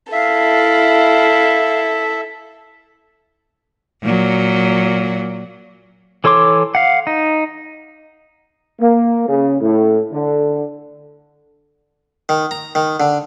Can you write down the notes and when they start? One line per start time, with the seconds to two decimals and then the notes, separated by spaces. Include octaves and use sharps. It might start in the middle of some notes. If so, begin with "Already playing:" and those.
0.12 E4 A4 E5 F5
4.02 A#2 F#3
6.24 E3 A4 C#5 C6 D6
6.75 F5 F#5
7.07 D#4
8.80 A#3
9.28 C#3
9.61 A2
10.12 D3
12.29 D#3
12.51 A#5
12.75 D#3
13.00 D3